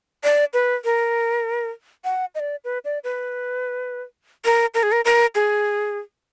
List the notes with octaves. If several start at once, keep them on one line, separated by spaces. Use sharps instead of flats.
D5
B4
A#4
F#5
D#5
D5
B4
D5
B4
A#4
A#4
G#4
A#4
A#4
G#4